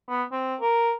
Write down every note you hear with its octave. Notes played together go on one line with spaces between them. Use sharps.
B3
C4
A#4